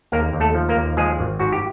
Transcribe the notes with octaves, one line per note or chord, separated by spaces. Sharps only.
D#2 A#3 A#4
D#2
A3 A4
F3
A#3 A#4
D#2
F3 G#3 G#4
G#1
G#2 F#4
G4